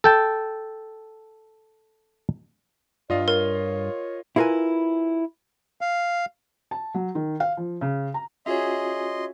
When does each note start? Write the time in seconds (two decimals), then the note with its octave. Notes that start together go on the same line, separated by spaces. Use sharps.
0.04 A4 G5 A5
3.10 G2 F4 D5 D#5 F5
3.28 A#4 C#5
4.36 E4 F4 G#4 A#4 B4 G#5
5.81 F5
6.71 A5
6.94 F#3
7.15 D#3
7.40 F5
7.57 F3
7.81 C#3
8.14 A#5
8.46 C#4 F4 F#4 G#4 C#5 D#5 E5 C6